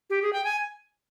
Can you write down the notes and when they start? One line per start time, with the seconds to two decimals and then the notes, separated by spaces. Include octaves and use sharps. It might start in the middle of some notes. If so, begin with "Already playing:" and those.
0.10 G4
0.22 G#4
0.33 G5
0.44 G#5